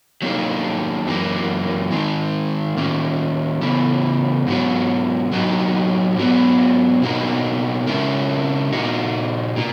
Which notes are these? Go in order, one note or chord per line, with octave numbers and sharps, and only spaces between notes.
F#3 A#3 D#4 G#4
F#2 E3 A#3
D#3 G#3 D#4
D#3 A#3 C#4
C#3 E3 B3
G#2 F#3 B3 F#4
F#3 A#3 D#4 F#4
G#2 F#3 B3
B2 A#3 D#4 F#4
C#3 G#3 C#4 E4 A#4
A#2 A#3 D#4 F#4
B2 A#3